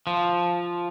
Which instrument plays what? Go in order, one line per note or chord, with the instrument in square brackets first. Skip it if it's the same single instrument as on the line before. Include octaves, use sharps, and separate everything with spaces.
[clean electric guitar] F3